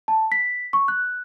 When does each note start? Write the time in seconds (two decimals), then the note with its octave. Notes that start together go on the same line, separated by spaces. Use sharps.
0.08 A5
0.32 B6
0.73 C#6
0.88 F#6